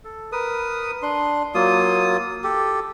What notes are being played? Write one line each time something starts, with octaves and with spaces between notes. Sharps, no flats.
A4
A#4 B4 D#6
D4 C6
F#3 A#3 F4 D#6
G4 A4